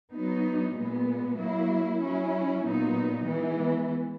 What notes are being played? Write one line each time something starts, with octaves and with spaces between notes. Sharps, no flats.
F#3 B3 D#4
A#2 G#3 B3
F#3 A#3 E4
F#3 C#4 E4
A#2 F#3 B3 D#4
E3 G#3 B3